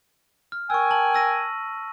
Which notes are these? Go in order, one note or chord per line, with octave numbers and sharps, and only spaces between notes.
F6
A#4 G5 G#5 C#6 E6
A5 F#7
E6 A#6 D#7